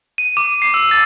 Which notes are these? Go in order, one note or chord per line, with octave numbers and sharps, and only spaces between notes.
D#7
D6
C7
E6
A6